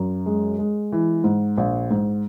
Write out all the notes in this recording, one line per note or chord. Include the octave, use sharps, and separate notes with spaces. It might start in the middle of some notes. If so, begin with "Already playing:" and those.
Already playing: F#2
G#3
G#3
E3
G#2
A#1
G#2